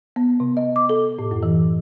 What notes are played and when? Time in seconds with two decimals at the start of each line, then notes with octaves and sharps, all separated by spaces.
0.16 B3
0.40 C3
0.57 D#5
0.76 D6
0.89 A4
1.19 A2
1.31 F#2
1.43 E3